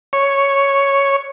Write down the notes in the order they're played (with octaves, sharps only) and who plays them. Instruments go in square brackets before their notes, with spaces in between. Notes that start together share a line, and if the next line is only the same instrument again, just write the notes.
[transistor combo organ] C#5